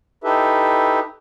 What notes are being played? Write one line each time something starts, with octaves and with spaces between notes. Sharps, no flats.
D#4 E4 G4 A4 B4 E5